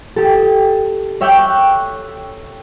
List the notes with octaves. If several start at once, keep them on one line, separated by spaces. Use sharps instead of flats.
G4 A4
C#5 E5 G5 D6 F#6 G6